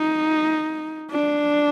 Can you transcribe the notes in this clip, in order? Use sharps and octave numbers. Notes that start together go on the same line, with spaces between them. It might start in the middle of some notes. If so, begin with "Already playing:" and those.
Already playing: D#4
D4